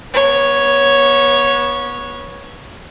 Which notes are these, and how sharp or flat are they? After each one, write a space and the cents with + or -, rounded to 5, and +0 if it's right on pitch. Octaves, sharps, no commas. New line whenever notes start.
B3 -30 C#5 +0